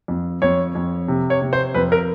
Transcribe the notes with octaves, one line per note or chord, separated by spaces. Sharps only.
F2
F2 C#5
F2
C3
C#5
C3
C5
F2 B4
A#4